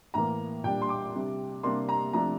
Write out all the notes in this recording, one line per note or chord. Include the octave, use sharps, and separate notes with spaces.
A2 E3 A#3 A#5
A#2 G3 D4 G5
C6
D6
C3 G3 D4
C3 G3 A#3 D4 C6
A#5
C3 F3 A3 D4 A#5